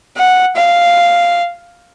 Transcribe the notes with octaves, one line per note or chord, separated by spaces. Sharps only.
F#5
F5